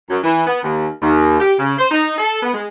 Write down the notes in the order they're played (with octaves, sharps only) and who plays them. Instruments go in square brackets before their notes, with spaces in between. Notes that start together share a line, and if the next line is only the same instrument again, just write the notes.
[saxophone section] F#2
E3
B3
D#2
D#2
G4
C#3
C5
D#4
A4
B3
G#3